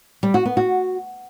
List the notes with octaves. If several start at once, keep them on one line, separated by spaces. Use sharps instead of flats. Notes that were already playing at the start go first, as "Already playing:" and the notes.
G3
F#4
B3
F#4